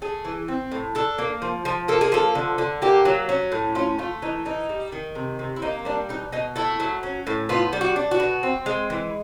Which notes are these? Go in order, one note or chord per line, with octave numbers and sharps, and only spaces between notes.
A3 G#4
E3
C4
A2
D4 A4
A#3
F3
F3
A#3 A4
G#4
F3 A4
D3
D3
A#3 G4
F#3
C#4
A2
C#4 F4
A3 F4
E3 D#4
E3 D#4
G3
D#3
C3
C3
E4
A#3 D#4
G3 D4
B2 D#4
B2 D#4
A3 E4
F#3
C#4
A2
B3 F4
G3
F#4
D4
F#4
B2
C4
G#3
E3